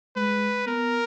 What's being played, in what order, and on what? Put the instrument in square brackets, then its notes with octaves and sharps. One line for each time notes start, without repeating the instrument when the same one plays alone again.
[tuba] G#3 [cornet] B4
[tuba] B3 [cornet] A#4